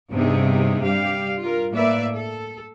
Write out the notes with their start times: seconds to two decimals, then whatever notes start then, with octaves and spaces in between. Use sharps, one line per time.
0.11 G2 C3 B3 D#4 G#4
0.81 G2 G3 G4 F5
1.41 F4 A#4
1.72 A2 A#3 B4 D5 E5
2.14 A4